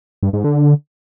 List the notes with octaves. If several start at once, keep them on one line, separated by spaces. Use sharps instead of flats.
G2
G#2
D3